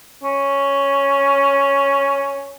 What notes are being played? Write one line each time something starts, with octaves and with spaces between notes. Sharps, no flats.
C#4